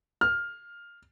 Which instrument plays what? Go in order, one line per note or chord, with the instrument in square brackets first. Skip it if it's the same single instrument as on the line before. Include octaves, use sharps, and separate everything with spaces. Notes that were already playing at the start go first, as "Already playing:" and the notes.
[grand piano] F6